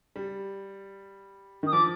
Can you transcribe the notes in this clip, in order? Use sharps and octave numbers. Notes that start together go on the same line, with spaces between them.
G3
D#3 D#6
F3 D6